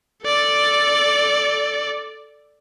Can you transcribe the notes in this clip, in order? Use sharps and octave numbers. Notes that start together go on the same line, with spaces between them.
A4 D5